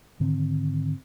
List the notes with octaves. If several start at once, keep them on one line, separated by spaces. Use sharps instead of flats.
G#2 D3 D#3 C4